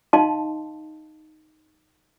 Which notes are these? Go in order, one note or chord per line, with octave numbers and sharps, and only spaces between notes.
D#4 D#5 F5 A5 C6